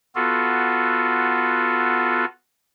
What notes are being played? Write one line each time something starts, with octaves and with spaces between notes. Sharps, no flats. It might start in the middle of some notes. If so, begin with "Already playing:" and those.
B3 F4 F#4 A4